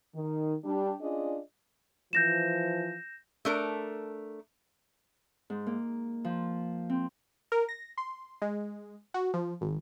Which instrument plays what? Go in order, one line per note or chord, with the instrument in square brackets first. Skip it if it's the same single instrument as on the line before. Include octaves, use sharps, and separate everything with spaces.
[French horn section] D#3
G3 D4 G4
C#4 D4 F4 G#4 D5 D#5
[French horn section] E3 F3 [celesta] G6 A#6 E7
[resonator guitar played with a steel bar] A3 D4 A#4
[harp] G#2
A#3
F3
C4
[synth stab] A#4
A#6
C6
G#3
F#4
F3
G#1